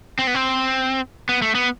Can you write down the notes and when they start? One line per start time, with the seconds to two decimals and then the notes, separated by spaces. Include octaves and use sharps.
0.19 C4
0.27 B3
0.34 C4
1.29 B3
1.42 A3
1.55 B3